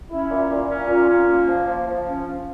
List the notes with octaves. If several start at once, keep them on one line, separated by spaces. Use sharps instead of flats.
C#4 E4
A#2
A#2
C#4
A#2 F4
C#4
A#3
F3
F3
F3
C#4
C#4